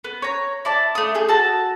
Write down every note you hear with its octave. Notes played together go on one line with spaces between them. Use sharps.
B3
C#5 A#5
E4 D5 A5
A3 D#6
G#4 G6
F#4 A5 E6